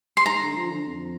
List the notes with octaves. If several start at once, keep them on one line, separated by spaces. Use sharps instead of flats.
C6
G#2 A#5
D3
F3
D3
F2